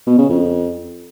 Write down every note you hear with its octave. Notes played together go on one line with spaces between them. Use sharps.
B2
C#3
F2